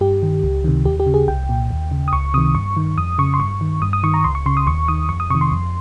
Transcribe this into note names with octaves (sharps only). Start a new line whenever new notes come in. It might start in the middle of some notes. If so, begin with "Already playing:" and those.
G2 G4
D#3
C#2
C3 D#3
D#2 G4
G4
C#3
G#4
C2 G5
A#2
D#2
C#3
D#6
C#2 C#6
C3 D#3 D#6
G2 C#6
D#3
F2 D#6
C#3 C#6
C6
G2 C#6
D#3
G2 D#6
D#6
D#3 C#6
A#5
C#2 C6
C#6
C#3 C6
D#6
D#2 C#6
D#3 D#6
F2 C#6
D#6
C3 D#3 C#6
C6
F2